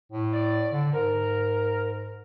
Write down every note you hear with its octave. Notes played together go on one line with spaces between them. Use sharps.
A2
D5
D3
G#2 A#4